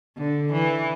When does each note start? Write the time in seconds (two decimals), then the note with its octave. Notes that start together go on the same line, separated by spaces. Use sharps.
0.17 D3
0.52 E3